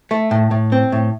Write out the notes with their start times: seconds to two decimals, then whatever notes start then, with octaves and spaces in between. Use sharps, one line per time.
0.11 A3
0.31 A2
0.51 A2
0.72 C4
0.92 A2